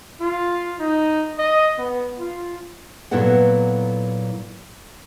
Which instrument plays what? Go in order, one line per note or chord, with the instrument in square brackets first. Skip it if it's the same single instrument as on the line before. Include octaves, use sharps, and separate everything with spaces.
[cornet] F4
D#4
D#5
B3
F4
[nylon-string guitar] A#2 F#3 B3 E4 A4 F#5